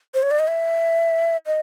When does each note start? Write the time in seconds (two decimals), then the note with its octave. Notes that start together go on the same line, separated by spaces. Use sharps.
0.14 C5
0.23 C#5
0.31 D5
0.39 D#5
0.48 E5
1.47 D#5